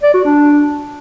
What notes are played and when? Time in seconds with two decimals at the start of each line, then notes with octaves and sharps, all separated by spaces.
0.03 D5
0.14 F#4
0.25 D4